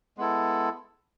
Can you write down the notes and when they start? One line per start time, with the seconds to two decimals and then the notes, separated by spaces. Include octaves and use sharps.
0.17 G#3 B3 E4 A4